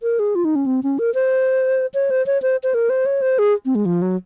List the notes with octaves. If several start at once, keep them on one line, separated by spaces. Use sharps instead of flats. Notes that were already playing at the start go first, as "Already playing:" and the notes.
A#4
G#4
F4
D#4
C#4
C4
C#4
A#4
C5
C#5
C5
C#5
C5
C5
A#4
C5
C#5
C5
G#4
C4
G#3
F3
F#3